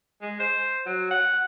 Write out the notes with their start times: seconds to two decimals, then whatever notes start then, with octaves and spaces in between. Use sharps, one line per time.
0.22 G#3
0.40 C5
0.86 F#3
1.10 F#5